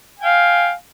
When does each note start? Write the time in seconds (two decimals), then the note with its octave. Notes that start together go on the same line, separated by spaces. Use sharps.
0.19 G#5
0.22 G5
0.25 F5